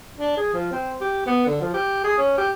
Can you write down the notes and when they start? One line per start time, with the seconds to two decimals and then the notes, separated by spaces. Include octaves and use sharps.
0.19 D4
0.37 G#4
0.54 F3
0.72 C4
1.01 G4
1.26 B3
1.46 D3
1.61 F3
1.74 G4
2.04 G#4
2.18 C#4
2.38 G4